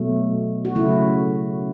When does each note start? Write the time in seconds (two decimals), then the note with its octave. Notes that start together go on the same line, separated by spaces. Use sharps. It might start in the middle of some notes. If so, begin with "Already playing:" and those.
Already playing: B2 F#3 A3
0.65 F#4
0.75 C#3 F#3 A3 E4